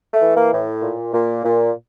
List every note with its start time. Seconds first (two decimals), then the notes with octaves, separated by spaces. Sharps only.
0.13 A3
0.21 E3
0.36 A#3
0.52 A2
0.82 A#2
1.13 A#2
1.44 A#2